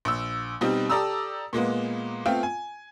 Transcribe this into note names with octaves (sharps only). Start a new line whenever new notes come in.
A#1 E6
B2 G3 C4 D#4 G4
G4 A4 D5 A#5 D#6 E6
A#2 G#3 A#3 B3
A3 B3 C4 F4 F5 G5
G#5